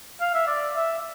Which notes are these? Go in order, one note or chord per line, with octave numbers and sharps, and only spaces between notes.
F5
E5
D5
E5